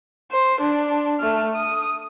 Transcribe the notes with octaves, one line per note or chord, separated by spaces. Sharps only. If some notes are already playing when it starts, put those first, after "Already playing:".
C5
D4
A3 F6
D#6